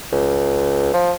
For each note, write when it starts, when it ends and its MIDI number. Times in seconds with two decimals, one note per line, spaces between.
0.12 0.92 37
0.94 1.13 53